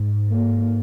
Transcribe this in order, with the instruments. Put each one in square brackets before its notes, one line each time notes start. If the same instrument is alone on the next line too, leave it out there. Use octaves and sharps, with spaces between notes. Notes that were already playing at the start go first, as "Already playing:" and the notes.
Already playing: [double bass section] G#2
A#3